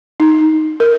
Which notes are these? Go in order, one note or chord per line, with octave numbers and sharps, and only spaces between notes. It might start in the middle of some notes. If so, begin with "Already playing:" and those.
D#4
A#4